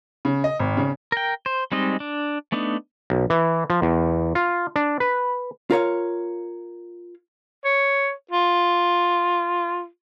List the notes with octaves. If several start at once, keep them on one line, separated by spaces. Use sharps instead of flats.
C#3
D#5
G#1
C#3
A#4 G5
C5
G3 G#3 C4 D#4 D#5
D4
A3 B3 D4 D#4
B1
E3
F3
E2
F4
D4
B4
F4 A#4 C#5 F5
C#5
F4